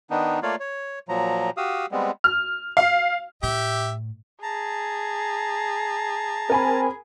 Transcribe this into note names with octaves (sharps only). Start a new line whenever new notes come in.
D#3 B3 D4 D#4
A3 A#3 F4 C#5 D5 F5
C#5
A#2 F3 F#3 A#5
F#4 G4 F5 D#6 E6
G3 G#3 B3 C4
F6
F5
A2 G4 E5
G#4 A5 A#5
C4 A#4 G#5 B5